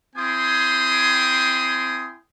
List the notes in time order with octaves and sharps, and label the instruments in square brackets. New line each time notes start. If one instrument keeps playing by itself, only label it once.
[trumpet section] C4 E4 G5 G#5 C6 D#6